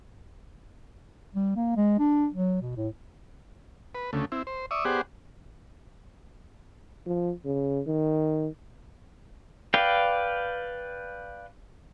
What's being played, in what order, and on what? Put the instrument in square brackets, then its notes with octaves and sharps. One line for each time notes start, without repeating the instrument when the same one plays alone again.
[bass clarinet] G3
A#3
G#3
D4
F#3
B2
A2
[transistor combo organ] B4
D2 C#3 A3
C4 E4
C5
D5 E5 C#6 D#6
B3 G4 G#4 C5 D5 F#5
[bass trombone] F3
C#3
D#3
[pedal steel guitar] B4 D5 F5 G5